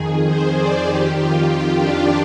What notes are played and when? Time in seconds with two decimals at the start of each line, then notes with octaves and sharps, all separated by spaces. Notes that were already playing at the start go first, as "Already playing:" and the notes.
Already playing: F2 D#3 G#4
0.27 C5
0.57 D5
0.87 F2 D#3 G4
1.18 F4
1.47 F4
1.77 D4